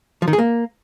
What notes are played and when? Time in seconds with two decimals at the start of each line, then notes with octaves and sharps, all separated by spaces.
0.22 F3
0.28 D#3
0.33 G#4
0.38 A#3